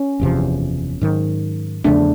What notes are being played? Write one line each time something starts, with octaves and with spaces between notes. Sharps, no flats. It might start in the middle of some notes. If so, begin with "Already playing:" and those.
Already playing: C#4
F#1 E2 C3 F3
G#2 D#3 F#3
E2 C#3 F3 A3 D4